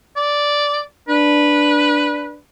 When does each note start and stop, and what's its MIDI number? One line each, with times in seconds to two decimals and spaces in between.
0.16 0.81 74
1.08 2.38 62
1.08 2.36 71